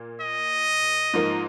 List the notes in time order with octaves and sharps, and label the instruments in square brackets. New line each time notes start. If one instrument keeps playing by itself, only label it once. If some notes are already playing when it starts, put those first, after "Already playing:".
Already playing: [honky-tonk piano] A#2 A#3
[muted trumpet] D#5
[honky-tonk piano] G#2 F3 A#3 D#4 A#4